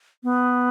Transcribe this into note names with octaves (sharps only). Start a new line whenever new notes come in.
B3